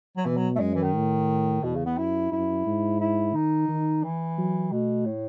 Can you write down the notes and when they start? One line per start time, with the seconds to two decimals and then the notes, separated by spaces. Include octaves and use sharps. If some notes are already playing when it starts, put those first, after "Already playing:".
0.17 F#3
0.25 B2 E3
0.37 F#3
0.56 A3
0.60 F#2 G#3
0.75 E3
0.82 D#3
0.95 A2
1.63 E2 B2
1.75 C#3
1.86 B3
1.97 F#2 E4
2.32 F#2 E4
2.66 G#2
3.00 E4
3.34 D#3 D#4
3.68 D#3
4.04 E3
4.38 F#3
4.72 B2 A3
5.06 A2